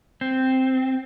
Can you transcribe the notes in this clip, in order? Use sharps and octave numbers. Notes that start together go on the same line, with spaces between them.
C4